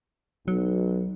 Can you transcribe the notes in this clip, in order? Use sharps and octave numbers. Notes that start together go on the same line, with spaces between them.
B1 F#3